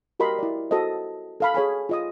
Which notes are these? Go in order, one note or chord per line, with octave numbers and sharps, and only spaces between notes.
F#4 G4 A#4 D#5 B5 C6
E4 D5
F#4 A4 C5 D#5
A4 F5 B5
G#4 C#5 G#5 B5
F4 D#5 D#6